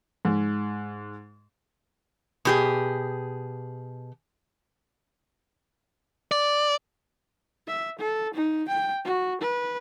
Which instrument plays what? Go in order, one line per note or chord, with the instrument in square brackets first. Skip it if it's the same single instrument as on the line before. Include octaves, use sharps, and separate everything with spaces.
[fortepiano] G#2
[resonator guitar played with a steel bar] B2 G4 G#4
[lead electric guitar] D5
[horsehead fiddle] E5
A4
D#4
G5
F#4
B4